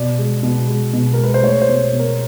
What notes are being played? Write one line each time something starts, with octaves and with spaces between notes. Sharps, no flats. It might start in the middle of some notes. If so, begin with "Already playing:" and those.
Already playing: B2 D5
G#3
B2
G#3
B2
G#3 A#4
B4
C5
A3 C#5
C5
B2
B2
A#4